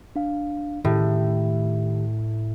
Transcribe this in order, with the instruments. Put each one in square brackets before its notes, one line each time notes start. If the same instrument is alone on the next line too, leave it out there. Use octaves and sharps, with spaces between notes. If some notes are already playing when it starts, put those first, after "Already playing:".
[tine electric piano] D4 F5
[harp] A2 [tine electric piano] D#3 G4